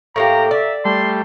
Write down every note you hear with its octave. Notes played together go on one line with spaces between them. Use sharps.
A2 A#3 G4 A#5
D5 E5
G3 A3 C6